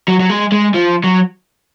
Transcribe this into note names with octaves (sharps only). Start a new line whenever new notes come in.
F#3
F#3
G#3
G#3
F3
F#3